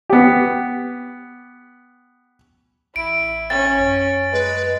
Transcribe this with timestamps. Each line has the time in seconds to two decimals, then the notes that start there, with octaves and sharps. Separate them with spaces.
0.10 B3 G4
2.96 A1 E4 D7
3.50 C#4 A6
3.80 F#2
4.32 G#3 B4